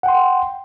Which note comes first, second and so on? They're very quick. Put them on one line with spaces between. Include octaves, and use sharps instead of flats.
F#5 G5 C6